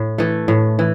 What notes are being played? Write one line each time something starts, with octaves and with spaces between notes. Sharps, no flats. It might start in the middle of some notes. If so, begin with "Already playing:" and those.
Already playing: A2
E3 A3
A2
E3